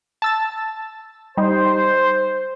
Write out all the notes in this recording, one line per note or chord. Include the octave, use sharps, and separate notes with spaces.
A5 E6 A6
G3 D#4 C5